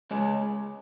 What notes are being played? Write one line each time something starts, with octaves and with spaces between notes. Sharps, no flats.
C#2 C#3 G#3 C#4